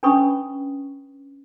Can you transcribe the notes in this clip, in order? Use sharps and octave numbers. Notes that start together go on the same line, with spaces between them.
C#4 D4 B4 B5 C#6 D#6